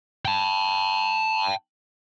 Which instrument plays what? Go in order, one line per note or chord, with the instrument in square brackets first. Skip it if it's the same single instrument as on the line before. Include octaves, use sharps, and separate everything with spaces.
[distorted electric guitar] G5 A5